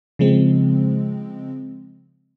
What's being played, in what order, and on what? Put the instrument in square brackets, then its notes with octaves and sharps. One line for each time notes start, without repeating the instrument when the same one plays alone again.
[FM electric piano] C#3 F3 G#3 C4